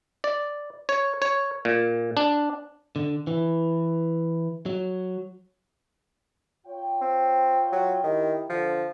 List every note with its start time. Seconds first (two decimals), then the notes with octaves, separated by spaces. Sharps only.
0.24 D5
0.89 C#5
1.22 C#5
1.65 A#2
2.17 D4
2.96 D3
3.27 E3
4.66 F#3
6.67 F4 C#5 G5
7.02 C4
7.72 F#3
8.04 D#3 D#4 E4 G4
8.50 D3 F3